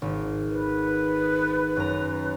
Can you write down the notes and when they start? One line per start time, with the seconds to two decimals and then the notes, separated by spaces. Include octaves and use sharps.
0.02 G#1
0.48 B4
1.76 F#2 A#5